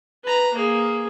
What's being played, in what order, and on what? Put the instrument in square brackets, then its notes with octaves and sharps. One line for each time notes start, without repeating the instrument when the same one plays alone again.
[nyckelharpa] B4 A#5
A#3 G#4